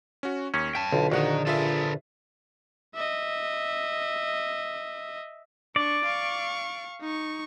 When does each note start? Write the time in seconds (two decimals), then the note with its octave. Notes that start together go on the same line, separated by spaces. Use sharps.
0.23 C#4 F#4
0.54 D#2 C#4
0.75 G5 A5 B6
0.92 B1 D3 F4
1.12 A#1 D#3 D#4 F#4 F#5
1.47 F4 G#4 A4 B4 E5
2.95 D#5 E5
5.76 D4 D5 C#6
6.05 F5 C#6
7.01 D#4 C#6